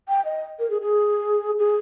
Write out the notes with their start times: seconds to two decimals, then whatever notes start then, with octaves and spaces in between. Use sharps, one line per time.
0.08 G5
0.25 D#5
0.59 A#4
0.70 G#4
0.81 G#4
1.59 G#4